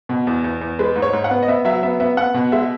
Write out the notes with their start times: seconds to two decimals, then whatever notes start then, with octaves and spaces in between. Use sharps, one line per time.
0.09 B2
0.27 E2
0.44 E2
0.61 E2
0.79 G#3 B4
0.96 G#2
1.02 C#5
1.13 G#2
1.24 F#5
1.31 B3
1.43 D#5
1.48 B3 E5
1.65 F#3 E5
1.83 B3 E5
2.00 B3 E5
2.17 B3 F#5
2.34 B2
2.52 G#3 E5